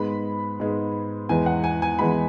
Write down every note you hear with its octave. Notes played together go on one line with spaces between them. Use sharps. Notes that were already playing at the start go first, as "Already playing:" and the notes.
Already playing: G#2 G#3 B3 B5
G#2 G#3 B3
E2 E3 G#3 G#5
F#5
G#5
G#5
E2 E3 G#3 B5